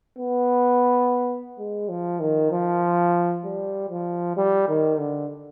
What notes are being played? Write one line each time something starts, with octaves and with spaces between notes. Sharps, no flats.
B3
G#3
F3
D#3
F3
G3
F3
G3
D#3
D3